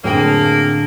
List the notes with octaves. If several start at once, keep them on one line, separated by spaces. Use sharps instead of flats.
A2 D3 F#3 A#3 C4 G#4 G5